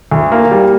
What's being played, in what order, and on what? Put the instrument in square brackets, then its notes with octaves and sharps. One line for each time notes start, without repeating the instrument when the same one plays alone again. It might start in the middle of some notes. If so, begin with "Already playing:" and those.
[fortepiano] D2
A#3
G3